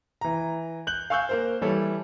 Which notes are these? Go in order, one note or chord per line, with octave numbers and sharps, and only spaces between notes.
E3 A#5
F#6 G6 F#7
F5 G#5 C#6 E6 F#6 G6
A#3 A#4 C5
E3 G3 A4 C#5